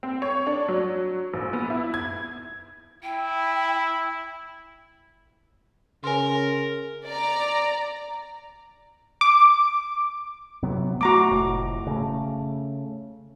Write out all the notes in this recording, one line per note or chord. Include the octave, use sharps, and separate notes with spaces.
C4
C#5
D4
F#3
A#1
B3
E4
G#6
E4 G5
C#3 A#4 G#5 C6
D5 A#5
D6
C3 F#3 B3
A3 F#4 A#5 D6
F1 A2
C#3 A3